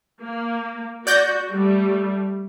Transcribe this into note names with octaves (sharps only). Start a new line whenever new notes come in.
A#3
F#4 D5 G6 A#6
G3 A3